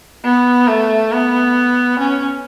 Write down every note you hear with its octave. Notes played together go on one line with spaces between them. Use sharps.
B3
A3
B3
C#4